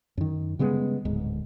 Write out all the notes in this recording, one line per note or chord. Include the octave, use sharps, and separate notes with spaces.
F#2 D#3
C#3 G3 G#3 B3
D1 G#2